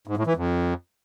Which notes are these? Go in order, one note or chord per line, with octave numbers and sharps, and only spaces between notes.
G#2
A2
E3
F2